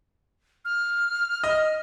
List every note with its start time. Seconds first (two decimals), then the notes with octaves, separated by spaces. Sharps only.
0.65 F6
1.44 D#5